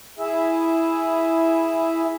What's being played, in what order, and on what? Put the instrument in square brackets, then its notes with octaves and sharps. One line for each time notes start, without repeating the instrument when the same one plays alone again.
[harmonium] E4 G#4 E5